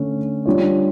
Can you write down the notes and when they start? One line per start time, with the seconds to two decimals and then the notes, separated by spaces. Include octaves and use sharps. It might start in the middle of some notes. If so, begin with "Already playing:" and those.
Already playing: D3 A3 C#4
0.46 G3 D4 F4 C#5